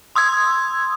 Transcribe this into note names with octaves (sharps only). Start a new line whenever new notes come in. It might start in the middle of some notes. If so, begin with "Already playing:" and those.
C6 D#6 E6 G#6